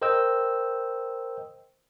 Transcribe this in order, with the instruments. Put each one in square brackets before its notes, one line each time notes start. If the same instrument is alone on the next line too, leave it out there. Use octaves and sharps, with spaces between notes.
[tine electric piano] A#4 C5 D#5 G5 E6 G6